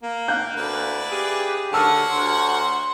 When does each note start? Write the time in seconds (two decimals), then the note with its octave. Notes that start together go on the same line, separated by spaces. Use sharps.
0.03 A#3
0.28 F5 F#6 G6
0.57 D2 E4 B4 D5
1.11 G4 G#4
1.73 D3 F#4 C#5 F#5 A5 E6 F6
2.11 D2 C6